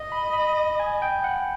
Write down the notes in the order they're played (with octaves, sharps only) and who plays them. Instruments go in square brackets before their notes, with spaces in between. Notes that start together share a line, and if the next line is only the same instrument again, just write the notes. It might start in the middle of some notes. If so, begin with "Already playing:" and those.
Already playing: [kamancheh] D#5
[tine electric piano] B5
B5
G#5
G5
F#5